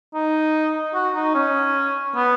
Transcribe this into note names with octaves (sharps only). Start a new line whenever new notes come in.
D#4
F#4
D#4
C#4
B3